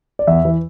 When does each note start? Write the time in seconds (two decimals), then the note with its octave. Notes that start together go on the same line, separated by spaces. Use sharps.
0.19 D5
0.27 E2 E5
0.45 E3